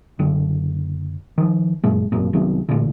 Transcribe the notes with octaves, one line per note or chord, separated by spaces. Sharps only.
F#1 D3 D4
D#3 F3
G1 F#2 A#2 G#3
G#1 F#2 A#2
C2 D#3 F#3 B3
A1 A#2 D3